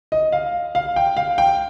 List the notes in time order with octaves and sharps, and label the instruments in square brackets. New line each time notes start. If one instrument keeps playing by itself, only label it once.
[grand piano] D#5
F5
F5
G5
F5
G5